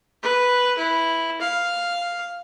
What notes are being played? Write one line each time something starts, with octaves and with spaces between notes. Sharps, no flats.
B4
E4
F5